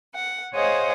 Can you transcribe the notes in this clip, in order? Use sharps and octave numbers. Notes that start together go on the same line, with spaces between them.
F#5
G#4 C5 C#5 D#5 F5 F#5